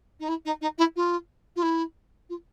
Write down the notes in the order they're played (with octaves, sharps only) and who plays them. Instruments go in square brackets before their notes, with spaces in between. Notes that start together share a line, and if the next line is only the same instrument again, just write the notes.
[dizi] D#4
E4
D#4
D#4
E4
F4
F4
E4
F4